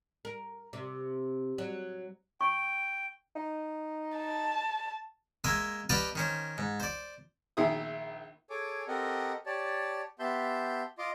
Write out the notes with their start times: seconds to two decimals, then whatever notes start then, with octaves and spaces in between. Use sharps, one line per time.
0.25 A#4
0.73 C3
1.58 F#3
2.41 G5 C#6
3.36 D#4
4.17 A5
5.44 G#3 A#3 E5 G#5 C6
5.89 G4 B4 D5 D#5 F5 A5
6.15 D#3 C#4 C5
6.58 G#2
6.80 C5 D5
7.57 A#1 D#3 G#4 E5 D#6
8.50 G#4 A4 C#5 G#5 D6
8.88 C4 G4 A4 A#4 D#5 F#5
9.46 G4 C#5 D5 A5
10.19 B3 G4 E5 A5 C6 G6
10.98 F4 D#5 C6 D6